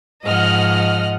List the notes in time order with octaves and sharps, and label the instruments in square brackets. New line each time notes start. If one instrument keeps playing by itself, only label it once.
[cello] G#2 F3 [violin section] D#5 F#5 F6